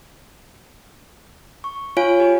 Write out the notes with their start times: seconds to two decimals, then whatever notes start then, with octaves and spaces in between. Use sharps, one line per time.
1.64 C#6
1.97 F4 C#5 F5 G#5 D7
2.20 G4